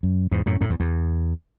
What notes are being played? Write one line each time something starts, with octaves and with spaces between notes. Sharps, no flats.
F#2
E2 G#2
F#2 A2
F#2 A2
E2
E2